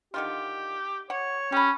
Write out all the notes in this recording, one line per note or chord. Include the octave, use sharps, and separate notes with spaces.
D3 D#3 F4 G4
C#5 F#5
C#4 G4 B5